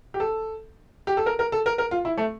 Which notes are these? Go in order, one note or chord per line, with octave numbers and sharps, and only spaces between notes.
G4
A4
G4
A4
A#4
A#4
A4
A#4
A#4
F4
E4
A3